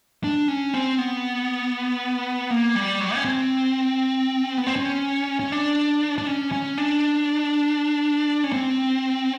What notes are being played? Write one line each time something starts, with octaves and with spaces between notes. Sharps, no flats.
D4
C#4
C4
B3
A#3
G3
F#3
C#4
C4
B3
C4
C#4
C#4
D4
D4
C#4
C#4
D4
C#4
C4